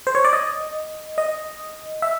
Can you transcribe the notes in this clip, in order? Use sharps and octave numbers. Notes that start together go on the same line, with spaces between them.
C5
C#5
D5
D#5
D#5
E5